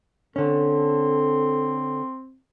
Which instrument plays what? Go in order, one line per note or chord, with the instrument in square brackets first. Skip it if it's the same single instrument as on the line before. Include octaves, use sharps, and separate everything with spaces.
[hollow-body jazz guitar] D3 C#4 [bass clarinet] C4 [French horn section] A4